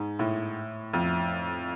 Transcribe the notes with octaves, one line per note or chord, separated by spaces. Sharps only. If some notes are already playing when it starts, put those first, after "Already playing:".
Already playing: G#2
A2
F2